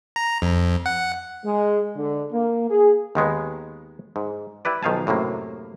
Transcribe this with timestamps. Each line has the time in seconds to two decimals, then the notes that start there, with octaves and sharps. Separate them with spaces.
0.16 A#5
0.42 F2
0.86 F#5
1.44 G#3
1.96 D3
2.32 A#3
2.70 G#4
3.15 D#2 D#3 G#3 B3
4.16 G#2
4.65 E4 G4 B4 D5
4.83 B1 D#3 F3 F5 G#5 A5
5.07 F#2 A2 C3 A#3